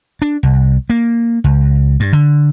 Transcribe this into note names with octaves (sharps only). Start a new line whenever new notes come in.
D4
C2
A#3
C#2
G2
D3